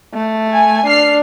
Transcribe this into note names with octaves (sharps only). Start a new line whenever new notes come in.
A3
G#5
D4 F6 C7